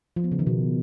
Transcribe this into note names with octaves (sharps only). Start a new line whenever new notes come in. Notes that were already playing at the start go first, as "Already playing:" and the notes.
F3
B3
C#3
D#3
B2